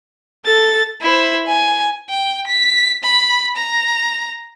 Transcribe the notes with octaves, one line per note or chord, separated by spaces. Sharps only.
A4 A6
E4 C5
G#5
G5
B6
B5
A#5